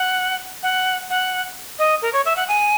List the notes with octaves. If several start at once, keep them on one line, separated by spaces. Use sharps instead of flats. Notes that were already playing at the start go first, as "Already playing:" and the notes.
Already playing: F#5
F#5
F#5
D#5
A#4
C#5
E5
F#5
G#5